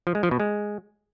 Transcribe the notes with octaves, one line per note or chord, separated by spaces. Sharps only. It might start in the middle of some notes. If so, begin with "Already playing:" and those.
F3
G#3
F3
B2
G#3